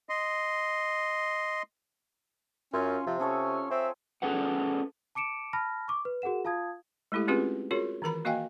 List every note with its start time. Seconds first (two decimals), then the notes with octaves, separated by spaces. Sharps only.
0.09 D#5 C6
2.73 F#2 C#4 F4
3.07 C3 F3
3.20 C#4 G#4 A4 C#5
3.71 C4 E5
4.22 C#4 G#4 A4 B4 F#5
5.15 A5 D6 C#7 D7 E7
5.53 A5 B5 F6 A#6
5.88 C#6 D6
6.05 B4
6.22 F#4 G#4 A#4 F#5 E7
6.45 F4 F5 A5 D#6 G#6
7.12 G#3 A3 E4 G4 A4
7.28 C4 C#4 F4 G4 G#4 B4
7.71 F4 F#4 G#4 A#4 C#5
8.02 D#3 E3 A#4 A#5 B5
8.25 A#3 F#4 D#5 F5 G5 G#5